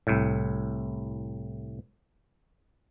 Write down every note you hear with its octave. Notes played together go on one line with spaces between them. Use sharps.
C2 A2